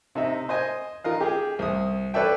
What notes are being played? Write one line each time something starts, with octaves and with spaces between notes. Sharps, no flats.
C3 D#4 E5
C5 D#5 G#5
D#4 F4 A#4 D#5 F5
G4 G#4
C2 D#6
A4 B4 C#5 D5 E5 G5